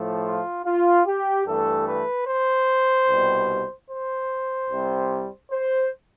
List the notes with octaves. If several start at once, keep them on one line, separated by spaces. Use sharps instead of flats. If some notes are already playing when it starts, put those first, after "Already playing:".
Already playing: A2 F3 A3
F4
F4
G4
G2 E3 A3 A4
B4
C5
C2 B2 G3
C5
C2 C3 G3
C5